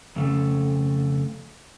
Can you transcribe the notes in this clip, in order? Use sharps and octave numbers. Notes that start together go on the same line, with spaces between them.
F2 C#3 A3